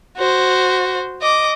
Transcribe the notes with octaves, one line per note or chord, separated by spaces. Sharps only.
F#4 C5
D#5 D6